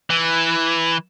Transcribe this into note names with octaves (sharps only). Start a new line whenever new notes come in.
E3